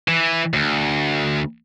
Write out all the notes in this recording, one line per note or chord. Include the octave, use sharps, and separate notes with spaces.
E3
D2